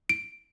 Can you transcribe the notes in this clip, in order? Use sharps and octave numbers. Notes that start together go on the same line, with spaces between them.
D7